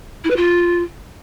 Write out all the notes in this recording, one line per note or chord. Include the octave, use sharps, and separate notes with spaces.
E4
B4
F4